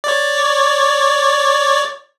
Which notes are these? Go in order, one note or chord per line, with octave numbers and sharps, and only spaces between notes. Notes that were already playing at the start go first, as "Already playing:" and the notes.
C#5 D5